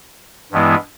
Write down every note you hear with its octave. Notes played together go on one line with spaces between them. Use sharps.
G2 E3 G#3 B3 E4